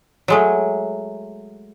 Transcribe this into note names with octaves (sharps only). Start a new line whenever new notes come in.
F#3 G#3 A3